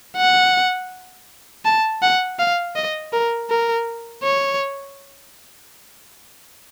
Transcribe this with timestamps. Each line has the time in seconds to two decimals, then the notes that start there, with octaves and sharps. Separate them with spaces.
0.17 F#5
1.65 A5
2.02 F#5
2.39 F5
2.76 D#5
3.13 A#4
3.50 A#4
4.23 C#5